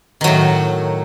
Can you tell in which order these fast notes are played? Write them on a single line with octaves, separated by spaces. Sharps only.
D#3 F#3 A2